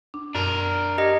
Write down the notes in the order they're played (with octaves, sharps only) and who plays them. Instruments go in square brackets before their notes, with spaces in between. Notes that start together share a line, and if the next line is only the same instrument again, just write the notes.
[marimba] D4
[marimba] F#2 [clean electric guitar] D4 A#4
[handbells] G4 D#5